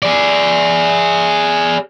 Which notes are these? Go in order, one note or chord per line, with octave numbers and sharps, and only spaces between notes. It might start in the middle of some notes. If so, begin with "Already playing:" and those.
G#4 D5